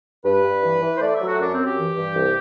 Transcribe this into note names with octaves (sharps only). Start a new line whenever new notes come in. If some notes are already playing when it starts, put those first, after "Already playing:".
G2 B4
G2
E3
E3
C5
A3 D5
E5
F#3
F#4
F#2 D4
C4
F#2
G4
E3
G2
C2